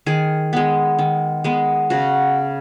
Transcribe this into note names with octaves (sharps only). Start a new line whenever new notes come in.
D#3 G#4
G#3 B3
D#3
G#3 B3
C#3 F#4